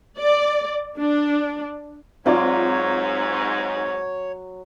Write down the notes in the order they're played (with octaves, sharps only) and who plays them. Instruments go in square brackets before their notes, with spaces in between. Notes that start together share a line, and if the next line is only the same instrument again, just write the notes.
[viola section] D5
D4
[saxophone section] G#2 [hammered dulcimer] F#3 [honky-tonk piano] C4 F4 D5 [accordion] C#5